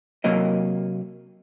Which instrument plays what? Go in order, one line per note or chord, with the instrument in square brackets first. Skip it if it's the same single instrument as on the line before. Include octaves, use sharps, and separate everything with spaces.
[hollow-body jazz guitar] C3 F#3 A#3 A#4 D#5